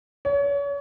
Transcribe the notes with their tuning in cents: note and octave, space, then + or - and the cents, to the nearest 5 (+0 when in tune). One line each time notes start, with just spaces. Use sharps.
C#5 +35